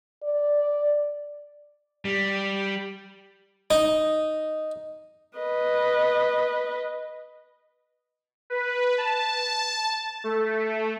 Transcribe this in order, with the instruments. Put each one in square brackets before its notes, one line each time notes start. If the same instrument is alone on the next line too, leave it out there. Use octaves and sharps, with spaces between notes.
[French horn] D5
[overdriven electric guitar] G3
[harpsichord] D#4
[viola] B4 D#5
[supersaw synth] B4
A5
A3